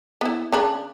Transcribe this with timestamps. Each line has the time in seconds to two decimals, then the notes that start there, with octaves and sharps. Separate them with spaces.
0.21 B3 E4
0.52 C#3 D4 B5